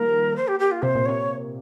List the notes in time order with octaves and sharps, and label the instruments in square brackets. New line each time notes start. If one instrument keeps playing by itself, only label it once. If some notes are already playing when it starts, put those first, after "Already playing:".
Already playing: [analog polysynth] D#3 F3 G3 A#3 [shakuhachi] A#4
[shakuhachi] C5
G4
G4
F4
[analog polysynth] C3 [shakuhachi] C5
[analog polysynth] A#2
[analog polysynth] C3 [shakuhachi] C#5